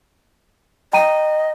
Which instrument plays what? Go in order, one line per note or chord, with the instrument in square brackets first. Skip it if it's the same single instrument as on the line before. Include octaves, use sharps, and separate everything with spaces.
[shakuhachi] D#5 [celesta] G5 A#5 D#7